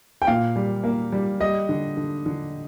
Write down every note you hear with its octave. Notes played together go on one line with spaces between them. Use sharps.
G5
A#2 F5
G3
A#3
G3
G3 D#5
D3
D3
D3